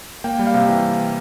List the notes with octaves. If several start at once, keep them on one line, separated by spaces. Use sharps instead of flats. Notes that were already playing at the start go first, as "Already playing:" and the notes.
A#3 G5
G3
F5
C3
E3